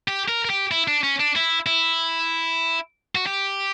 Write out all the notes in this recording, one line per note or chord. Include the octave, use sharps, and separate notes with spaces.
G4
A#4
A#4
G4
E4
D4
C#4
D4
E4
E4
F#4
G4